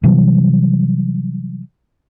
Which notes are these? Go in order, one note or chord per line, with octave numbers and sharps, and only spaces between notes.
C3 E3 F#3 G3